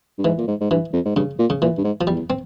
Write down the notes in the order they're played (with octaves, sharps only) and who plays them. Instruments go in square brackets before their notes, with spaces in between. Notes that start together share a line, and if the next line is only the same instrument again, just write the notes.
[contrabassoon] G2
[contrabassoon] G#2 [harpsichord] E3
[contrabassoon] A#2
G#2
G#2
[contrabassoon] G2 [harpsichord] E3
[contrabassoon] F2
G#2
[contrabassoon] G2 [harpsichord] C#3
[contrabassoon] A#2
[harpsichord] C#3
[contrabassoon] A#2 [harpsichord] E3
[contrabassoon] G2
G#2
[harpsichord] F3
[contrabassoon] E2 [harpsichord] G3
[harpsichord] C4